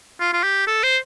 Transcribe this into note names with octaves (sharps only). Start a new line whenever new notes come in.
F4
F4
G4
A4
C5